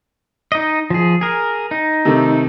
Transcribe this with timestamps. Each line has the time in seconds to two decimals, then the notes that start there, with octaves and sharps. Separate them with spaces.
0.52 D#4 D#5
0.90 F3 G#4
1.21 G#4 A#4
1.71 D#4
2.05 C3 D#3 A3